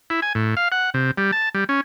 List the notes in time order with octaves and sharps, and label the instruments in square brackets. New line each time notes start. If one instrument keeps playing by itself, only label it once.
[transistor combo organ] E4
G#5
A2
F5
F#5
C3
G3
A5
G3
C#4